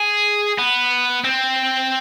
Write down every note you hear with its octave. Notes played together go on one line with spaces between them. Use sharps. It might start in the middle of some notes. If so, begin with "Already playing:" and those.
Already playing: G#4
B3
C4